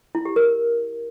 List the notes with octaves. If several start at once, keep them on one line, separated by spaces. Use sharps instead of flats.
E4
G4
A#4